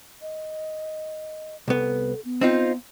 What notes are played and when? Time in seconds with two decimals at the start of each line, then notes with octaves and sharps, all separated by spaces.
0.22 D#5
1.68 C2 B3 A4
2.25 B3
2.41 C4 D#4 F4